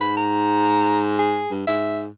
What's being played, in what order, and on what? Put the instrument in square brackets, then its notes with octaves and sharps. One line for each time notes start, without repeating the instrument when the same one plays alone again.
[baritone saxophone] G#2 [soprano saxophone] B5
[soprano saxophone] A#5
G#4
[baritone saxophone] G2
[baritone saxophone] G#2 [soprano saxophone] E5